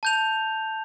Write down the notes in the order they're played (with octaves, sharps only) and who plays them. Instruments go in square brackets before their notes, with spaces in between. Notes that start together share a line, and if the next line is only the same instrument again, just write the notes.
[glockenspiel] A5 G6 F7